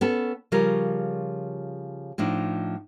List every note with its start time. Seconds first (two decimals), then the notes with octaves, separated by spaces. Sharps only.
0.01 B3 C#4 A4
0.52 C#3 F3 G3 F4 A#4 C#5
2.18 A2 F3 D4 D#4